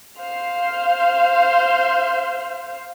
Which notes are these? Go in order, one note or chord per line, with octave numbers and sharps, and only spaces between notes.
C5 F5